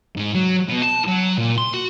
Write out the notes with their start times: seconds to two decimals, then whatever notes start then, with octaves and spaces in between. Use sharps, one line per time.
0.16 G#2
0.34 F#3
0.69 B2
0.82 A5
1.08 F#3
1.38 A#2
1.58 C6
1.74 F#4